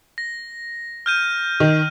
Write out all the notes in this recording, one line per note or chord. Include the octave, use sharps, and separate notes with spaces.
A#6
F6 G6 D#7
D#3